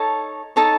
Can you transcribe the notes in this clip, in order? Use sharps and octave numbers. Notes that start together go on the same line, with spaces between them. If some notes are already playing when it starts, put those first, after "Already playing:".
Already playing: D#4 A4 C#5 A5
D#4 A4 C#5 A5